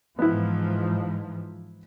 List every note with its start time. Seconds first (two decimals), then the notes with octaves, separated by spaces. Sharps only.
0.19 G#2 E3 F3 B3 E4